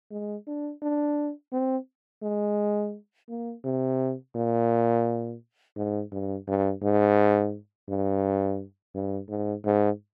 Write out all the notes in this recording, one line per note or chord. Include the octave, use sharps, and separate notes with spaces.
G#3
D4
D4
C4
G#3
A#3
C3
A#2
G#2
G2
G2
G#2
G2
G2
G#2
G#2